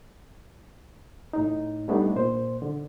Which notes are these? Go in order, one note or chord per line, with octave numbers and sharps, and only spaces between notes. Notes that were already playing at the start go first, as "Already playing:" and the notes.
A2 D#4
G3 A3 B3 D4 D#4
A#2 C5
D3